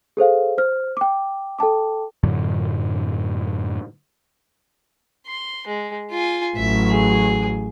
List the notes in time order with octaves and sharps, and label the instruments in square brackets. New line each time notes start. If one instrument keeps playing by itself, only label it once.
[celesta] G#4 A4 C5 F5
C5 F6
G5 D6
A4 G5 A5 D6
[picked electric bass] F#2 A2 D3 F#3
[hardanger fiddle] C6
G#3
F4 G#5
[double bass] A1 F#3 [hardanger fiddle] E5
[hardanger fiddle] G#4